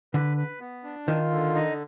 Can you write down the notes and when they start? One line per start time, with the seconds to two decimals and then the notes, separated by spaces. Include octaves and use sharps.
0.14 D3 B4
0.37 B4
0.60 B3
0.84 D4
1.07 D#3 F4
1.30 D3
1.55 D#4